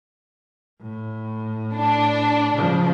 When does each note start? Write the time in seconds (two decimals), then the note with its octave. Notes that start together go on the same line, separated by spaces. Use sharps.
0.82 A2
1.75 D4
2.55 C#3 F3